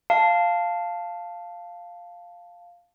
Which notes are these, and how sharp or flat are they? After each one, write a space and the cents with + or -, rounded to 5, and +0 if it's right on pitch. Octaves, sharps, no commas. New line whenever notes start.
F5 +0 A5 +0